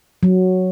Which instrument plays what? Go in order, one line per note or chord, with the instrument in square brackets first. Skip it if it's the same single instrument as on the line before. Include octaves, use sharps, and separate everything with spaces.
[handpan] F#3